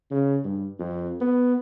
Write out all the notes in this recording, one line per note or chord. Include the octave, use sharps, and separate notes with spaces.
C#3
G2
F2
B3